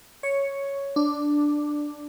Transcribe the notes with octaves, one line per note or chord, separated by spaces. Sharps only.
C#5
D4